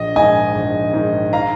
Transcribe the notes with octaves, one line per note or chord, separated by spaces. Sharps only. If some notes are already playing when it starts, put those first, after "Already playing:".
Already playing: A#1 D#5
G#2 D#3 D#5 G#5
A#1
G#2 D#3
F5 A#5